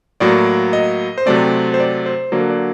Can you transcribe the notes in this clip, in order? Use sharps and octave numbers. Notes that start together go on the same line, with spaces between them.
A2 F#3 A#3 D5
D#5
C5
C3 F#3 A3 C4 D5
C5
D5
C5
D3 F#3 A#3 D5
D5